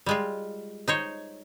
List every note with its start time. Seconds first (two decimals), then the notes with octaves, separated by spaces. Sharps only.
0.06 G3 G#3 F4
0.88 D#4 C5 C#5